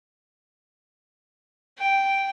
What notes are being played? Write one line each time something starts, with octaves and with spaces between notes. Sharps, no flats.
G5